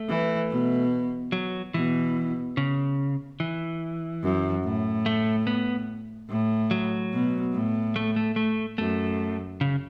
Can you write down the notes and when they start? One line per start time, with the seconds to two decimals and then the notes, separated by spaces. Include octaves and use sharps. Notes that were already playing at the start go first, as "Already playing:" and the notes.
Already playing: A3
0.09 E3
0.50 B2
1.32 F#3
1.74 B2 E3
2.57 C#3
3.40 E3
4.23 F#2
4.64 A2
5.06 A3
5.47 B3
6.29 A2
6.71 F#3
7.12 B2
7.54 A2
7.96 A3
8.16 A3
8.36 A3
8.78 F#2 A3
9.61 C#3